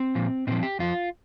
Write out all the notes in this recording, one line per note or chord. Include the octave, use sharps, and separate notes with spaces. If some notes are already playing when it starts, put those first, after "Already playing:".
Already playing: C4
A#2 F3
A#2 F3 C4
G4
F2 F3 F4